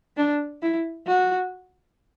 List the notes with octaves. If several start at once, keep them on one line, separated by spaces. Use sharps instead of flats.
D4
E4
F#4